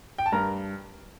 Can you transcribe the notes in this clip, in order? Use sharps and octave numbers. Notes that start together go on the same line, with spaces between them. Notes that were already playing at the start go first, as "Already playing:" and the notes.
G5
A5
G2 A#4 A#5